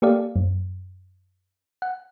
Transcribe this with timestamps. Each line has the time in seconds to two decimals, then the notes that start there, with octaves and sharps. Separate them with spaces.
0.02 A#3 G4 A4 D5 F5
0.36 F#2
1.82 F#5